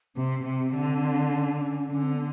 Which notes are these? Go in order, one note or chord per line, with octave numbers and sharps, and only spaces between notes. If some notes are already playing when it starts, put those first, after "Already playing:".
C3 C4
C3
D3
C#4
D4
C#4
D3 C#4
C4
B3